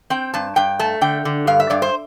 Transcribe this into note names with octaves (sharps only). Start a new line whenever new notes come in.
C4 G5
G2 A5
G2 G5
A3 A5
D3 G5
D3
G2 F5
E5
G2 D5
C5